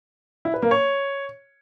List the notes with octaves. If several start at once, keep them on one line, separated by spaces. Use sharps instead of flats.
E4
B4
A#3
C#5